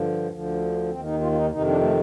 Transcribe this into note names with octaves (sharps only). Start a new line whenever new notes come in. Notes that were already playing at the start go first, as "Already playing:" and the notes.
Already playing: G2 D3 F3
D2 D3 F3
D#2 D#3 C4
D#4
F4
F4
D#4
F2 C3 D#3 D#4
D4
A3